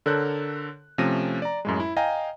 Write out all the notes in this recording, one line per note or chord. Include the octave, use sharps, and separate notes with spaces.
D3 A4 A#4 C#5 F#6 G6
C3 F3 A3 C#4 A#6 D#7
D5 A#5
F#2 A2 G#3
E4
D#5 F5 G5 G#5 A#5